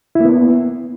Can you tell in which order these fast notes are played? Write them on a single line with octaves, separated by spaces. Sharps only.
E4 A#3 B3